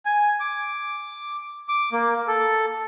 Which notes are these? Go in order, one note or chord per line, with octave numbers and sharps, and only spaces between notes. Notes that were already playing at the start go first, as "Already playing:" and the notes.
G#5
D6
D6
A#3
A4